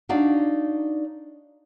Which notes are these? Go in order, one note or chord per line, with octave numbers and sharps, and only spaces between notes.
D4 D#4 F#4 D5 F5